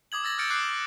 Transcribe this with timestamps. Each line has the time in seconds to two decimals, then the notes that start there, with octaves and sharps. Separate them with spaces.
0.12 D6 D#6 G#6 F#7
0.23 E6 A6 A#6 F#7
0.38 E6 F6 G6 A6 C#7 D7
0.50 D6 F#6 C7